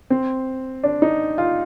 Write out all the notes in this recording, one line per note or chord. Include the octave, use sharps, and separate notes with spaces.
C4
D4
D#4
F4